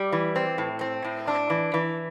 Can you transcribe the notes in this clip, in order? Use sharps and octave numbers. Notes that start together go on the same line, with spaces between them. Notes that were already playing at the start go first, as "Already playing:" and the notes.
Already playing: G3
E3
C4
A2
C4
A2
D4
E3
E3